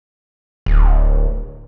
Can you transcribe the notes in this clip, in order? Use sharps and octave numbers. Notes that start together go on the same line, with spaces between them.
D1